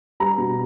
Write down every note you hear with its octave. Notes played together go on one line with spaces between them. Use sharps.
G3 A#5
B2